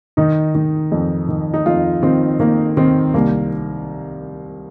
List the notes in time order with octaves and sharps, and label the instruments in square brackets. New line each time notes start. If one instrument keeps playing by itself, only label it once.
[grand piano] D#3 D#4
D#3
F2
D#3
D#4
F2 F4
D#3 C4
D#3 A#3
D#3 C4
C2 A#3